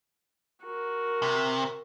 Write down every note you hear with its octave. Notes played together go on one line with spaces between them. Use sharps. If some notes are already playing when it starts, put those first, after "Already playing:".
F#4 A#4
C3